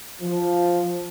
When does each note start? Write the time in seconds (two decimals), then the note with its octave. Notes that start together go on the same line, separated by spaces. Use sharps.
0.21 F3